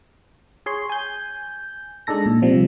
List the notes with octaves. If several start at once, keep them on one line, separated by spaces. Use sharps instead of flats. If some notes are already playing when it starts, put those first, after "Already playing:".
G#4 C#5 C6
G#5 G6
G#3 D4 D#4 A4 A#6
A#2
C3 F3 G3